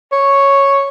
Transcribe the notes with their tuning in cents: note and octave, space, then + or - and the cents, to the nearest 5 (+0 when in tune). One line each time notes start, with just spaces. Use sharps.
C#5 -5